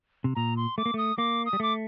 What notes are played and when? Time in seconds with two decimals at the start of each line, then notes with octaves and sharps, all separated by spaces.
0.24 C3
0.35 A#2 A#5
0.57 C6
0.78 A3 D6
0.86 A#3
0.94 A3 D#6
1.18 A#3 D6
1.46 D#6
1.53 G3
1.60 A3 D6